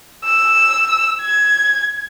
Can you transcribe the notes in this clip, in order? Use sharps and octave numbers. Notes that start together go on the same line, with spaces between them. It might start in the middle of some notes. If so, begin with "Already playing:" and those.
E6
G#6